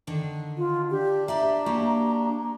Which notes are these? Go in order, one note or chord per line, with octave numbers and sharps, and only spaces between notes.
D3 D#3 D4
F4
D4 G4
G4 D5 E5 A#5
A#3 F#4 G4